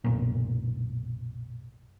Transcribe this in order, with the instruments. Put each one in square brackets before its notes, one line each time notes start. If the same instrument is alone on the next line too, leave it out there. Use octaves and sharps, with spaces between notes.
[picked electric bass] F#1 B1 A#2